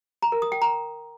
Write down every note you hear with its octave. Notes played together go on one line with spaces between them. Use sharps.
A#5
A#4
D#6
G5
A#5